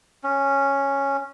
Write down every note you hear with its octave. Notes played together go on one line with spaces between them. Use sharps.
C#4